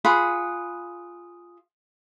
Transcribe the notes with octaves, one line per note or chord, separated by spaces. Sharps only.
F4 G#4 F#5 B5